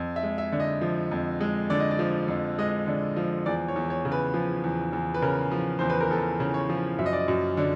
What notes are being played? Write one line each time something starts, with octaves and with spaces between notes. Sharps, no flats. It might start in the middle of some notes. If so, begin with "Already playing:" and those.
Already playing: F2
E5
G#3
E5
D3
D#5
F3
F2
G#3
D3 D5
D#5
D5
F3
F2
G#3 D#5
D3
F3
E2 D5
C#5
E2
C#5
C#3
B4
F3
E2
E2
B4
C#3 A#4
F3
E2 C5
B4
A#4
E2 A4
C#3
C#5
F3
F#2 E5
D#5
D5
D#5
F#2
D3